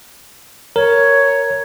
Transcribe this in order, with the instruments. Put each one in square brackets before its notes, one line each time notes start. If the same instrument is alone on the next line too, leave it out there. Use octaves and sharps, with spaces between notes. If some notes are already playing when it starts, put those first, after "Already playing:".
[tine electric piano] A#4 [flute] C#5